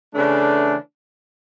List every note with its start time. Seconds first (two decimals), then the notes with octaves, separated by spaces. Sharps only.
0.14 C#3 E3 A3 D4